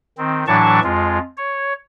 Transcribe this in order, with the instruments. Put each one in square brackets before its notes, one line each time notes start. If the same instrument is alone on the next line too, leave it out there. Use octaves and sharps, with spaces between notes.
[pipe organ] D#3 C4
A2 E3 F#3 D4 A5 C#6
F2 G#3 F4
C#5